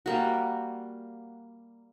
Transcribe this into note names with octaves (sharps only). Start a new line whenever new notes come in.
G3 A#3 F#4